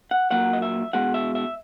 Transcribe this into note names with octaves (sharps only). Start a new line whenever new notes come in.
F#5
A#2 F#3 A#3 F#5
D#5
E5
B2 G#3 F#5
E5
E5